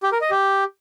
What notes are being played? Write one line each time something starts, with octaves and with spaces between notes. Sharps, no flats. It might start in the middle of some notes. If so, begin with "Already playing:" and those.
G4
A#4
D#5
G4